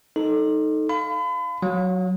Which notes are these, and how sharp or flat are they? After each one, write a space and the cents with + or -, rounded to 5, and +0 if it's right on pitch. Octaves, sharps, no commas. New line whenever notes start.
D#4 +0 A4 +0
F5 +0 B5 +40
F#3 +0 F5 +40